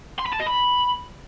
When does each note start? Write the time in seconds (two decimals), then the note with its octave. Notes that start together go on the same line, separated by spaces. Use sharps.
0.19 C6
0.26 B5
0.33 A5
0.40 D#5
0.47 B5